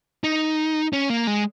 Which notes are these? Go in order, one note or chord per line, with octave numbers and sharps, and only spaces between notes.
D#4
C#4
A#3
G#3